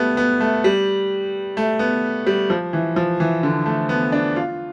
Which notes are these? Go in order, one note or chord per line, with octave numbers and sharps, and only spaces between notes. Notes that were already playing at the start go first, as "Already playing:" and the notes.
Already playing: G3 A3 B3
B3
A3
G3
A3
B3
G3
F3
E3
F3
E3
D3
A3
B3
D4
F4